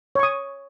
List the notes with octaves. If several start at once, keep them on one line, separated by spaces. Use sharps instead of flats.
C#5 C#6 D#6